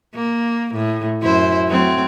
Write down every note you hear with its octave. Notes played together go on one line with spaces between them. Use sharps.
A#3
A2
F#2 E4 C5
F#3 A3 C4